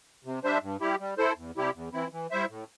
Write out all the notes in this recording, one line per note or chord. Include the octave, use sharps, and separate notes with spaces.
C3
G3 D4 C5 E5
G2
G3 E4 G4
G3
E4 A4 C5
E2
C3 G3 E4 G4
E2
E3 C4 E4
E3
G3 E4 C5 E5
A2